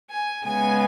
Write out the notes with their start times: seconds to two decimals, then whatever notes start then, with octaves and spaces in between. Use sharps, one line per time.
0.10 G#5
0.45 C#3 G#3 B3 G#5